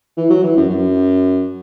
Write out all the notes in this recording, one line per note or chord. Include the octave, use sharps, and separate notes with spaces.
E3
F#3
E3
F#2
F#2